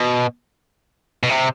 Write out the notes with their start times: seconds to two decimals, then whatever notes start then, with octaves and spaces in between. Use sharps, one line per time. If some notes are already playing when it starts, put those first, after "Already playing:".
Already playing: B2
1.23 B2
1.30 C3